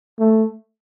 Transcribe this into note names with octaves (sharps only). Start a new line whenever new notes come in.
A3